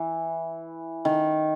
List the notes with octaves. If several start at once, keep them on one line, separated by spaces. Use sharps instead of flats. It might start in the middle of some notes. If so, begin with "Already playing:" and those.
Already playing: E3
D#3